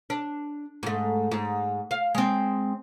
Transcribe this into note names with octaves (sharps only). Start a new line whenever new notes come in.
D4
G#2 A3
G#2
F5
G#3 C4